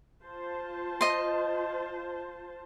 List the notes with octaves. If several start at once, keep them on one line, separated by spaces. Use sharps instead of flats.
F4 C5 A5
D#5 C6